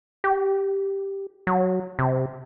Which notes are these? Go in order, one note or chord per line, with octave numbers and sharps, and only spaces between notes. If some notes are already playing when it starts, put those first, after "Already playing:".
G4
F#3
C3